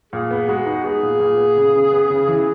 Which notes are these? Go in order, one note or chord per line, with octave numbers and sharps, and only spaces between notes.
A#2 G#4
B3
G#3 F#4
D#4
B3 G#4
A#2
A#2
B3
C#3
C#3
B3
C#3
E3